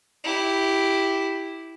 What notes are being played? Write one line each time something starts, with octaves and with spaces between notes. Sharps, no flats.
E4 G4